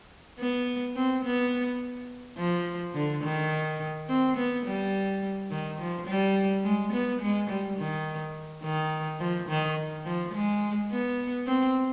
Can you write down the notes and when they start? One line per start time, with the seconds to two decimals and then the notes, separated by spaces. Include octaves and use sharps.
0.39 B3
0.96 C4
1.25 B3
2.38 F3
2.94 D3
3.23 D#3
4.09 C4
4.37 B3
4.66 G3
5.51 D#3
5.79 F3
6.07 G3
6.65 G#3
6.92 B3
7.21 G#3
7.49 G3
7.78 D#3
8.64 D#3
9.20 F3
9.49 D#3
10.06 F3
10.34 G#3
10.91 B3
11.47 C4